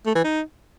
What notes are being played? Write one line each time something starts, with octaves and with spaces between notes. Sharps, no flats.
A3
E3
D#4